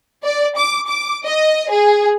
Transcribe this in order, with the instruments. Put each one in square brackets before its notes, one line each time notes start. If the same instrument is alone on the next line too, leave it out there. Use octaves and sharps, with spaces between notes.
[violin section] D5
D6
D6
D#5
G#4